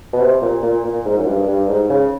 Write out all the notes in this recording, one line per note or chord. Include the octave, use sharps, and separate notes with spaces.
B2
C3
A#2
A#2
A#2
G#2
F#2
G2
G2
G#2
C#3